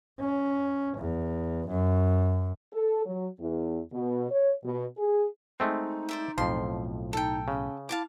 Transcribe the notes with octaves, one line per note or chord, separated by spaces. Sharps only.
C#4
E2
F#2
A4
F#3
E2
B2
C#5
B2
G#4
G#3 A3 C4 D#4
C5 D5 E5
B1 F2 A2 F3 C6
D#4 A4 G5
C#3 C#4
E4 F5 A5 D6